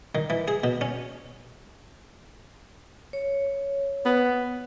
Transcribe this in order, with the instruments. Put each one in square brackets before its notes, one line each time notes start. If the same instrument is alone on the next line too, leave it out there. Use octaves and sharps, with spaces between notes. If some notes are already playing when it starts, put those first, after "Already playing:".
[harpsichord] D#3
E3
G#4
B2
C#4
[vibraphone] C#5
[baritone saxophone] B3